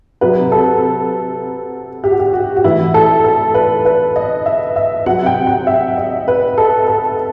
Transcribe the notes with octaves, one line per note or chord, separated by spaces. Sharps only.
C3 F#3 B4
A4
G4
F#4
G4
F#4
F#4
A2 E3 E4
A4
A4
B4
B4
D#5
E5
E5
C3 F#3 F#5
G5
F#5
E5
D#5
B4
A4
A4